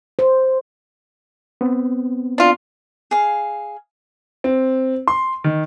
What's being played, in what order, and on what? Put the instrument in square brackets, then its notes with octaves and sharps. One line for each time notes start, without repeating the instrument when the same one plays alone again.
[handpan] C5
[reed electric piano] B3 C4
[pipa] D4 F4
[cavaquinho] G#4 F5
[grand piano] C4
C6
D#3